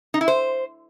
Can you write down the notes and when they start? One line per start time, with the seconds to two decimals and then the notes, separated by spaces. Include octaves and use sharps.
0.14 D#4
0.21 E4
0.28 C5